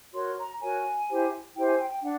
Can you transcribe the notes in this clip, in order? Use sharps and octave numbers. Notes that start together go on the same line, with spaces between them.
F#4 A#4 C#5 C6
A#5
F#4 A#4 C#5 G#5
E4 G4 C5
E4 G4 C5 G5
G#5
G5
G5
D4 F#5